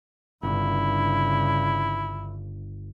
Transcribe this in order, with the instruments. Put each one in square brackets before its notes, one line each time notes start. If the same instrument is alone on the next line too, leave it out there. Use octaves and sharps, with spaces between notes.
[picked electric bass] G1 [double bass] G2 C#3 [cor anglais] E4